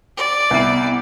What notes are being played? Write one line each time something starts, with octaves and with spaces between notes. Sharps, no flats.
D5
C2 B3 E4 F#5 C7